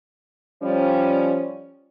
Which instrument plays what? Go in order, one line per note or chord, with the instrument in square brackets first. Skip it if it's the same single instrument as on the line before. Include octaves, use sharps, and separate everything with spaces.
[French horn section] F3 G3 C#4